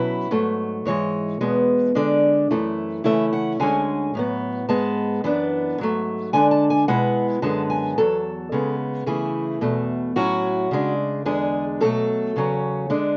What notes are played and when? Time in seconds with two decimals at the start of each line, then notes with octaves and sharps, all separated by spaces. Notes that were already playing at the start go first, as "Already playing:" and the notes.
Already playing: B2 F#3 C#4 E4 B4
0.31 G#2 F#3 A3
0.85 G#2 E3 G#3 C#5
1.41 E2 B2 G#3 B3
1.95 D3 G#3 D4 D5
2.51 F#2 E3 A3 E4
3.04 C#3 E3 A3 C#4 E4 E5
3.33 F#5
3.60 D2 D3 G#3 C#4 G#5
4.15 A2 F#3 B3
4.68 G#2 G#3 B3 A5
5.24 F#2 E3 B3 D4
5.78 G#2 F#3 A3
6.33 D3 G#3 D4 G#5
6.51 A5
6.70 G#5
6.88 B2 G#3 B3 E4 F#5
7.42 F#2 D3 G#3 B3 A5
7.70 G#5
7.98 E2 C#3 F#3 A4
8.52 C#3 G#3 B3
9.06 C#3 E3 A3 E4 G#4
9.61 E2 B2 A3
10.16 A2 F#3 C#4 E4 F#4
10.71 C#3 G#3 D4
11.25 E2 D3 G#3 D4 G#4
11.81 B2 F#3 A3 A4
12.36 E2 C#3 F#3 C#4
12.90 D3 G#3 D4